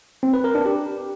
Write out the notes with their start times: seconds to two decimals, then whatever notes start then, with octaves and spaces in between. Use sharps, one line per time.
0.23 C4
0.34 B4
0.44 A#4
0.55 D4
0.65 G4